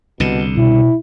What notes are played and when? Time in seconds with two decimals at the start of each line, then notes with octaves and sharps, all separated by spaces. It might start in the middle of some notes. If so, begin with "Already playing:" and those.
0.20 C2 B2 D3
0.57 B2 E4